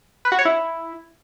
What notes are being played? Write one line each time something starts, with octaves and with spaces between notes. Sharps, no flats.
B4
F#4
C#5
E4